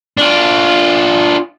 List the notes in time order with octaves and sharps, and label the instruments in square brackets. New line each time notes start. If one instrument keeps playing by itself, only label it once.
[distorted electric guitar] D4 F4